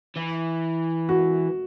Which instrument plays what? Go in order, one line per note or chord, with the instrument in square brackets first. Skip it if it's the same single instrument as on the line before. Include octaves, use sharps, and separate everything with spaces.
[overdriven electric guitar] E3
[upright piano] F#4